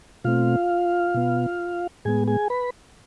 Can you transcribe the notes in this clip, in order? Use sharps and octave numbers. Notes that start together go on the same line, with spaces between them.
B2 A3 C4 F4 F5
B2 B3
A2 G#3 B3 G#4 G#5
G#4 G#5
B4 B5